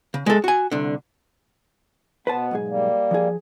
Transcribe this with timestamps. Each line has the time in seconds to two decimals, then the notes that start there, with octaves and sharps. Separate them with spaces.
0.14 C#3
0.26 G#3 A4
0.44 F#4 G#5
0.72 C2 D3
2.27 B2 B3 B4 C5 A5
2.51 B1 G#2 G#4
2.68 G3 A#3
3.11 F3 G#4